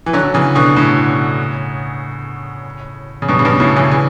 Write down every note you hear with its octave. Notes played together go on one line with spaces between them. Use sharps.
E3
D3 F#3
D3
C#3 E3
B2 D3
A2 C#3
C#3
G2 B2
C#3
G2 B2
A2 C#3
C#3 E3
C#3 E3